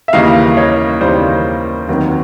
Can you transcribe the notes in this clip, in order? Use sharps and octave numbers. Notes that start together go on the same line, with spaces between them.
E5
D#2 C#3 E3 G3 A#3 D#5 F5
C#5 D#5
D#2 C#3 E3 G3 A#3 C5 D5
F1 D#2 D#3 F#3